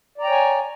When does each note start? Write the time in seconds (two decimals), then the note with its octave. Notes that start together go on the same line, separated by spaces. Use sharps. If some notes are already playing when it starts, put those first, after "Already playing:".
0.18 D5
0.21 A#5
0.24 G5
0.28 C#5
0.31 G#5